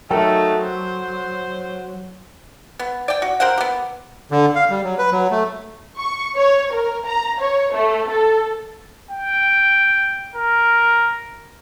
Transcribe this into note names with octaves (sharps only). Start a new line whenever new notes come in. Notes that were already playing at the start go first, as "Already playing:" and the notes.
F#3 A3 D#4 A4 A#4 G5
C5
B3
D5 G5
F#4
G4 A#4 C5 F#5
B3 G4
D3
F5
G3
F#3
B4
F#3
A3
C#6
C#5
A#4
A#5
C#5
A3
A4
G5
A#4